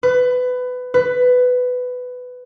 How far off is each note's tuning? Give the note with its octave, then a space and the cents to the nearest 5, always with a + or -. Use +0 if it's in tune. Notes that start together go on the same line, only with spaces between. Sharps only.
B4 +20
B4 +15